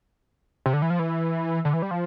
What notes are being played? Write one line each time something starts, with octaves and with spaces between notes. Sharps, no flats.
C3
D3
E3
F3
E3
D3
E3
G3
F3